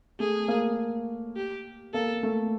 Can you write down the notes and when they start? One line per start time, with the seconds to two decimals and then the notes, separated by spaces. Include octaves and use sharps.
0.20 A3 G#4
0.48 A#3
1.36 G4
1.94 A#3 A4
2.23 A3